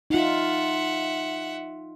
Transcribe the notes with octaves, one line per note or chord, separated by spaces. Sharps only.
D#4 F4 E5 F#5